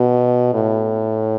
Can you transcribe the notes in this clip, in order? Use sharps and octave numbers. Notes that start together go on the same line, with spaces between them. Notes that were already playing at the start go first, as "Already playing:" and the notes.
Already playing: B2
A2